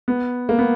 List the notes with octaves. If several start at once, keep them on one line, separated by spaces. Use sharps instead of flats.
B3
A#3
B3